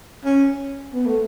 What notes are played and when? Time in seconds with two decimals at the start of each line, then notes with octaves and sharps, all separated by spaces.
0.25 C#4
0.94 B3
1.06 A3